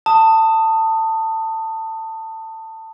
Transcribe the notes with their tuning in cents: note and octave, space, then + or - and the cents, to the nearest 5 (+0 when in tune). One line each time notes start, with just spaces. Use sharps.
A5 +20 D#6 +0